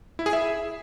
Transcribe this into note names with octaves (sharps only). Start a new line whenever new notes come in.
E4
G#4
E5